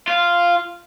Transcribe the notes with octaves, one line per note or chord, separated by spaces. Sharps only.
F4